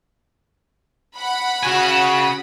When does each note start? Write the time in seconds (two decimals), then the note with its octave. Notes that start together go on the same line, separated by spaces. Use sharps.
1.16 F#5 B5
1.63 C#3 F#4 G#5